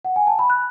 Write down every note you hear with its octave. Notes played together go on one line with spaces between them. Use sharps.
F#5
G#5
A5
B5
F#6